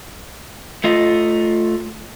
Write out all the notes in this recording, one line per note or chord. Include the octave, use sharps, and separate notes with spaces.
A3 F4 D#5